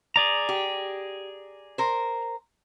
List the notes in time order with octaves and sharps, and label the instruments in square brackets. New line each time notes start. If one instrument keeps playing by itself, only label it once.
[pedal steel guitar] G#4 D5 A#5
[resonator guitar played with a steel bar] G4
A#4 C5